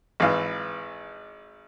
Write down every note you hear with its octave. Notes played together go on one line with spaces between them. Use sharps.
G#1 E3 F5